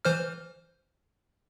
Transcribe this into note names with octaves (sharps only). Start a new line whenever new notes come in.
E3 C5 F6